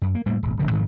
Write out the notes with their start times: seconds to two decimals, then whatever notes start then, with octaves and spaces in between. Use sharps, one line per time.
0.02 F#2
0.15 A#3
0.26 A2 G3 A#3
0.43 D#1 G#1
0.59 D#1 F2 D3 F3
0.71 G#2 D#3 F3 F#3